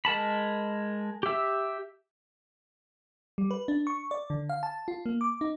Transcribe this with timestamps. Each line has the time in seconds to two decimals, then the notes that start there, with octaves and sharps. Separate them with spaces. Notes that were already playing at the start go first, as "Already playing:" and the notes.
0.05 G#3 A#4 A5 B5
1.23 G4 E5
3.38 G3
3.51 B4
3.68 D4
3.87 C#6
4.11 D5
4.30 D3
4.49 F5
4.63 A5
4.88 F4
5.06 A#3
5.21 D6
5.41 D#4